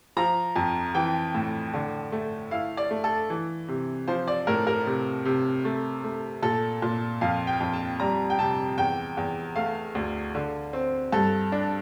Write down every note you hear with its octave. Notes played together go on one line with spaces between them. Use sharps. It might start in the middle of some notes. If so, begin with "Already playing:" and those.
F3 A#5
F2
E3 G5
A2
D3
A3
E4 F5
D5
A3
A4
E3
C3
F3 C5
D5
A2 A#4
A#4
C3
C3
A3
A3
A#2 A4
A#2
F2 F5
G5
F2
A5
G3 A#5
G5
C3 A5
E2 G5
E2
A3 F5
D2
D3
C4
G2 A4
D4